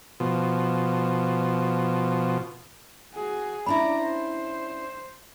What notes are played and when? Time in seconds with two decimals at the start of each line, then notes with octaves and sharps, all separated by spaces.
0.20 B2 F3
3.13 F#4 G#4
3.66 C#4 D4 E4 D5 A#5 B5
4.00 C5